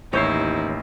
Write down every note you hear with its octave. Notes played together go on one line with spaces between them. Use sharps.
A1 D#2 D#4 E4 C#5 G6 C7